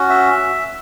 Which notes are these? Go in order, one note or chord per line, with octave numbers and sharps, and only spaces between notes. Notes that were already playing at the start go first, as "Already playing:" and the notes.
Already playing: C#4 F#4
E5